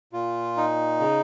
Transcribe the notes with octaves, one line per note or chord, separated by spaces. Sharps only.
A#2 F4
D#4
C#3